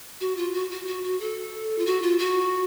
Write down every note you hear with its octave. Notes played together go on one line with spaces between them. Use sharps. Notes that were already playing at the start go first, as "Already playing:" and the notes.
F#4
F4
F#4
F#4
F#4
F#4
A4
F4
F#4
F4
F#4